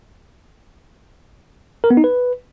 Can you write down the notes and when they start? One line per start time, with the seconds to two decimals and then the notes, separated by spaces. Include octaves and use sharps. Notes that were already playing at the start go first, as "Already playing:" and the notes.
1.84 A#4
1.90 B3
1.97 D#4
2.04 B4